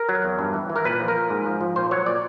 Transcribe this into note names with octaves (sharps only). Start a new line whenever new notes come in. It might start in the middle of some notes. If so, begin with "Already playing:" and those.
Already playing: A#4
F#3
E2
G2
E3
E3
A#4
A#2 B4
F3
A#4
A#2
G#2
F3
F3
A#2 C5
F#3 C#5
A#2 D5